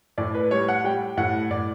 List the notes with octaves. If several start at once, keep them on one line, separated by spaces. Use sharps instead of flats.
A2 D5
B4
G3 C#5
F#5
G3 G5
A2 F#5
A2 D5